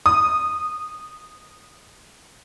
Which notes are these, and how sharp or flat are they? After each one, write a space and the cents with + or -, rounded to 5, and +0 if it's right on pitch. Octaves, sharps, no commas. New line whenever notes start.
D#6 -10